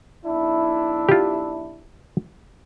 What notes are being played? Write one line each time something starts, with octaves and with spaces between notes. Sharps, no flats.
B1 D4 E4
F4 G4